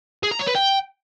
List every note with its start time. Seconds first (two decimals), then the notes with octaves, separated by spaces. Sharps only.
0.23 G#4
0.31 A#5
0.39 C#5
0.47 B4
0.55 G5